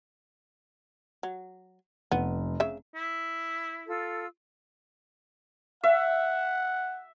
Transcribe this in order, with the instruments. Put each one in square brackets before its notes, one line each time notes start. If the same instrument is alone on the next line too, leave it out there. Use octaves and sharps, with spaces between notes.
[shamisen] F#3
[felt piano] F1 [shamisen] B3
[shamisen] C#3 E5
[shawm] E4
[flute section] F4 A4 E6
[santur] E5 [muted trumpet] F#5